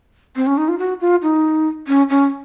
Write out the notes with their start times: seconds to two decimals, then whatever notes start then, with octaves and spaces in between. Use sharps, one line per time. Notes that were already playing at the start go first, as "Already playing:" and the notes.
0.36 C4
0.47 C#4
0.57 D#4
0.68 F4
0.79 F#4
1.01 F4
1.23 D#4
1.88 C#4
2.09 C#4